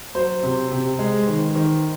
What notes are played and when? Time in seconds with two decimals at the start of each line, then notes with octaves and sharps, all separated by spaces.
0.15 F#3 C5
0.43 C3
0.71 C3
0.99 G#3
1.27 D#3
1.55 D#3